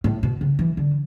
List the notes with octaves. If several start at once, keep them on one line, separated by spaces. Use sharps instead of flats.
A2
B2
C#3
E3
D3